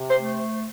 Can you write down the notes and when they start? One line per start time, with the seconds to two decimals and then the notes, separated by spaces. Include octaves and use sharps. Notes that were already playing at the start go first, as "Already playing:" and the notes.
Already playing: C3
0.10 C5
0.16 A3